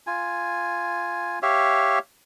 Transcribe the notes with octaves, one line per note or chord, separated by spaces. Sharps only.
F4 G#5
G4 C#5 E5 F5